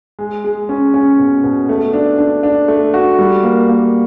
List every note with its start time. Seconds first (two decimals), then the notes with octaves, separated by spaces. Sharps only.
0.19 G#3
0.44 G#3
0.69 C#4
0.94 C#4
1.19 B2
1.44 B2
1.69 A3
1.93 D4
2.18 D4
2.43 D4
2.68 A3
2.94 F#4
3.19 G3
3.43 A#3
3.68 A#3